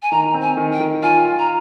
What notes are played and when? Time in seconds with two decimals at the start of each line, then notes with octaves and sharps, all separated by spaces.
0.02 G#5
0.12 D#3 A#5
0.34 C4
0.42 G#5
0.57 D#3
0.73 G5
0.80 D#3
1.03 F4 G#5
1.25 F4
1.39 A#5